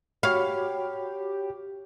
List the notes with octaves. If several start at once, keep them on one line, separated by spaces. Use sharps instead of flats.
F#4 G4 C#5 F5 B5